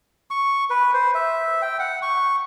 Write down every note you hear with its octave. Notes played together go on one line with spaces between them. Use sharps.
C#6
B4
C5
E5
G5
F#5
C#6